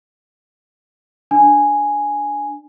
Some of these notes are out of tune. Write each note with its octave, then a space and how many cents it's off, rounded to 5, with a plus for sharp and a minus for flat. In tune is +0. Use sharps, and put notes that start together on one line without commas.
D4 +0 G#5 +0